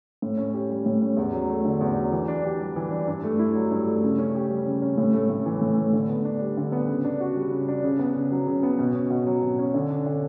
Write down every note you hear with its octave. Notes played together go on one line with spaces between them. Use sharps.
A2
C#4
G4
G3
A2
C#4
E2
F#3
A3
D3
E2
F#3
E3
D4
G4
G3
E3
D4
G2
A3
E4
F#3
G2
A3
C#3
C#4
G4
G3
C#3
C#4
A2
A3
A2
E3
A2
A3
D3
B3
D4
G3
D3
B3
C#3
D4
F#4
G3
C#3
D4
C#3
B3
C#3
F#3
C#3
B3
B2
C#4
B2
F#3
B2
C#4
D3
D4
D3